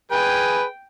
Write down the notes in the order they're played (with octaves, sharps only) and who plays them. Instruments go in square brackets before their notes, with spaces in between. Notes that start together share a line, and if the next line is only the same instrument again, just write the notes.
[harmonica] G#4 B4 [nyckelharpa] G5